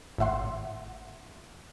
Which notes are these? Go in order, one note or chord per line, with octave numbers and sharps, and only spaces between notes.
G#1 A2 E5 F#5 C6